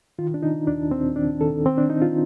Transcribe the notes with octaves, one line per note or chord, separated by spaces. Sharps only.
D#3 F4
D4
D#3 D#4
D#2 D4
D#2 C4
D#3 D4
D#3 A4
D#3 C4
D4
D#3 D#4
F4